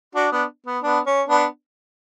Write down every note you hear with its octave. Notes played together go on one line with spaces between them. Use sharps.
D4 F#4
B3 D4
B3
B3 D4
C#4
B3 D4